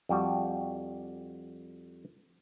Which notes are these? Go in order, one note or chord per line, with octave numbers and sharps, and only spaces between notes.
F2 G3 F#4